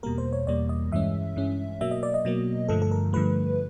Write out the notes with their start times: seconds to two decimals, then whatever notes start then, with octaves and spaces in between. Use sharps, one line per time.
0.03 E2 B2 G3 A#3 A#4
0.18 C5
0.33 C#5
0.47 E2 B2 G3 A#3 D5
0.69 D#5
0.91 G2 E3 G#3 C#4 E5
1.36 G2 E3 G#3 C#4
1.81 B2 F#3 A#3 E5
1.91 D#5
2.03 D5
2.14 D#5
2.25 B2 F#3 A#3
2.68 G2 D3 F3 A3 A4
2.82 A4
2.91 A#4
3.13 G2 D3 F3 A3 B4